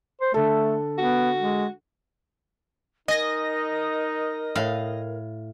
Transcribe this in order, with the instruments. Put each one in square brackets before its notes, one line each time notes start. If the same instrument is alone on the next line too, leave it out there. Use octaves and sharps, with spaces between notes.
[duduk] C5
[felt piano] D3 A4 [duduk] A3
[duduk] B3 [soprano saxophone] F#4
[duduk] G#3
[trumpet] D#4 [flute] A#4 [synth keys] D#5 A#6 [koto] G#5
[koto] A2 F5